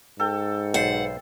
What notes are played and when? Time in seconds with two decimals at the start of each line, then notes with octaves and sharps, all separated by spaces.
0.20 G#2 A4 G5
0.74 B1 C5 F#5